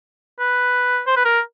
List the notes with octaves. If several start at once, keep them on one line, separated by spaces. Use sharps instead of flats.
B4
C5
B4
A#4